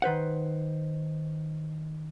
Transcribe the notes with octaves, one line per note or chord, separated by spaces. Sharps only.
D#3 B4 C5 F#5